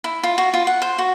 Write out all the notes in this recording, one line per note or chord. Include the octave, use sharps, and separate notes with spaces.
E4
F4
F#4
F4
F#5
C5
F#4